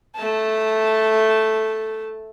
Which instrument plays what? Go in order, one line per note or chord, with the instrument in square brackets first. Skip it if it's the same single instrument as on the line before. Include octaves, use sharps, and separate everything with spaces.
[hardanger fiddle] A3 A5